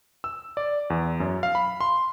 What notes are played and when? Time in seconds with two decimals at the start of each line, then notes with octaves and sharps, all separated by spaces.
0.24 E6
0.57 D5
0.90 E2
1.20 F#2
1.43 F5
1.55 B5
1.81 C6